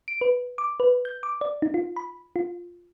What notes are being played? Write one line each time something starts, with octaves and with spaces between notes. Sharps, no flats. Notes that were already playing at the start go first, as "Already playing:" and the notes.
D7
B4
D6
B4
G6
D6
D5
D#4
F4
B5
F4